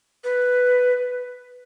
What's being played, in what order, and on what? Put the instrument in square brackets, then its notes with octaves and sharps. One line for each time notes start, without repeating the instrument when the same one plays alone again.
[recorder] B4